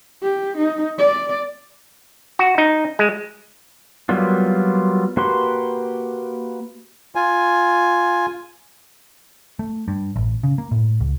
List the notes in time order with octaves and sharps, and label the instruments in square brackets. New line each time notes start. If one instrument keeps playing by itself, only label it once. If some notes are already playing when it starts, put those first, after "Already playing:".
[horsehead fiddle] G4
D#4
D5
[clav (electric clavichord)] F#4
D#4
G#3
[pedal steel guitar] F#3 G3 A#3 B3 F4
A#3 F#4 G4 B4 C6
[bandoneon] F4 G#5
[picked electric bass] A3
G2
A1
C#3
A#3
A2
C#2